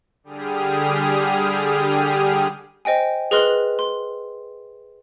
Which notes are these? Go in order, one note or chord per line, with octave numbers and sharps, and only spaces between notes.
D3 G3 G4 G#4 D#6 F6
C5 D#5 G5 G#5
G#4 B4 D#5 C6 F6 F#6
C6